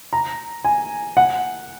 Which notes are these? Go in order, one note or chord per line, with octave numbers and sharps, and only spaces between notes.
A#5
G#5
F#5